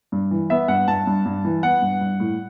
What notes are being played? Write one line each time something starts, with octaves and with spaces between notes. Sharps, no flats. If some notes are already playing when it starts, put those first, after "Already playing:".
G2
E3
B3 E5
G2 F#5
G2 A5
G2
G2
E3
B3 F#5
G2
G2
A2